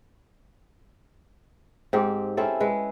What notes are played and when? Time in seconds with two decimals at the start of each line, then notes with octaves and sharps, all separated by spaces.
1.93 G#2 C4 G4
2.37 C4 C#4 E4 A4
2.60 G#3 B4